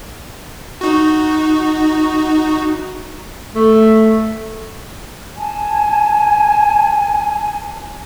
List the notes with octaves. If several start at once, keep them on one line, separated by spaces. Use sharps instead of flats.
D#4 F#4
A3
G#5 A5